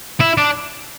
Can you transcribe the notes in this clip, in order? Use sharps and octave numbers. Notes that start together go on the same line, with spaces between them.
E4
D4